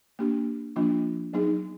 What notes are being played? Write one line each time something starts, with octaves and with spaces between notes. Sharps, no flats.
A#3 D4 G4
F3 A#3 D4 F4
F#3 B3 D#4 G#4